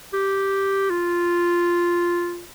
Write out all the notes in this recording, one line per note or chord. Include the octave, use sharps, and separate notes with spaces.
G4
F4